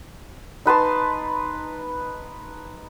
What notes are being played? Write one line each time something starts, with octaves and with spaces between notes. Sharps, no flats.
D#4 B4 A5 C6